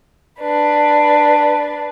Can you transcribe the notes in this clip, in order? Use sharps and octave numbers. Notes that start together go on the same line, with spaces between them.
D4 B4